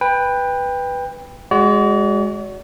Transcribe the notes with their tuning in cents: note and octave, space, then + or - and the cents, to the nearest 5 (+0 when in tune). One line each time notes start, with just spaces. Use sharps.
B4 +0 G5 +20
G#3 -10 F#4 +10 D5 -45